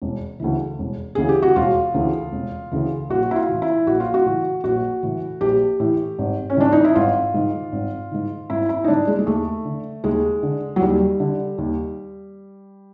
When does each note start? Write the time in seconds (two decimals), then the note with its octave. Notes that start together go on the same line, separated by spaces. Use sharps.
0.02 E1
0.40 D2 C#3 E3
0.79 E1
1.15 D2 C#3 E3 G#4
1.29 G4
1.42 F#4
1.56 E1 F4
1.94 D2 C#3 E3
2.32 E1
2.72 D2 C#3 E3
3.10 A#1 F#4
3.31 E4
3.36 F4
3.49 A2 E3
3.62 E4
3.87 A#1 F#4
4.00 F4
4.14 F#4
4.26 A2 E3
4.64 A#1 F#4
5.03 A2 E3
5.41 A#1 G4
5.80 A2 E3
6.19 G#1
6.50 C#4
6.57 G#2 D#3 D4
6.72 D#4
6.85 E4
6.95 G#1 F4
7.34 G#2 D#3
7.72 G#1
8.11 G#2 D#3
8.50 G#1 E4
8.69 E4
8.84 D#4
8.88 G#2 D#3 D4
9.08 G#3
9.19 G#3
9.27 D#2 A3
9.65 D3
10.04 D#2 G#3
10.43 D3
10.76 F#3
10.81 D#2 G3
11.20 D3
11.58 D#2